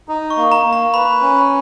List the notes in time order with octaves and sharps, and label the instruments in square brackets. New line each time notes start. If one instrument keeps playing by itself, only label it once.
[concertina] D#4
[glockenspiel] C#6
[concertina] A#3
[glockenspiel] A#5
[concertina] A#3
[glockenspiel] A#5
[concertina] B4 [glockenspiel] B5
[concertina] C#4